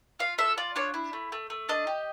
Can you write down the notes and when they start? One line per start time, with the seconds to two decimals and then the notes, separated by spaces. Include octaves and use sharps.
0.19 F4 F5
0.38 A4 E5
0.58 F4 D5
0.76 D4 C#5
0.94 E4
1.13 A3
1.32 A3
1.50 A3
1.69 D4 D#5
1.87 G4